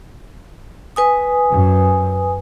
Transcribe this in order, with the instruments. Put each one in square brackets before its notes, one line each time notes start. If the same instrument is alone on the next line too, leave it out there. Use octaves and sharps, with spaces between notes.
[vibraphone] B4 G#5 D#6
[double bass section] F#2